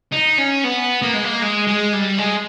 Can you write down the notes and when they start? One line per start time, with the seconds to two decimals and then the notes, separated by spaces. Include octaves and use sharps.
0.12 D#4
0.38 C#4
0.64 B3
1.02 A#3
1.13 G#3
1.24 A#3
1.42 G#3
1.67 G#3
1.93 G3
2.18 G#3